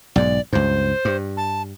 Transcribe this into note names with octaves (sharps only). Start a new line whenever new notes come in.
B1 G#2 D5
C#2 G2 C5
G2
A5